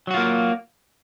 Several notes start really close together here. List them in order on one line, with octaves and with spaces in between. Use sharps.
F#3 F#4 F4 A#3